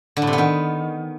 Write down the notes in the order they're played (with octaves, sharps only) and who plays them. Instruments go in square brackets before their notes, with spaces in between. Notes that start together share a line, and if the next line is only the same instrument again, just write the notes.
[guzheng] D3
A2
C3
B3
D#3